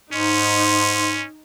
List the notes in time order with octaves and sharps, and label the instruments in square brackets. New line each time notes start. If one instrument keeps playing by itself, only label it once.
[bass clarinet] G#2 [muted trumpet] C#4 [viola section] D#4 [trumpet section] C6